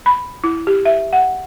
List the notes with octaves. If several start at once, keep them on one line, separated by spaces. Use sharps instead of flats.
B5
E4
G4
E5
F#5